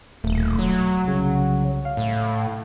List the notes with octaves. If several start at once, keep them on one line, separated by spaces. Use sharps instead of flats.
D#1 B1 A3
F#3
C2 C#3
F5
A2